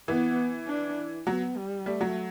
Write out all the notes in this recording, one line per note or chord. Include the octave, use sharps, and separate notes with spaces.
E3 B3
D4
F#3 B3
G3
G3 A3
F#3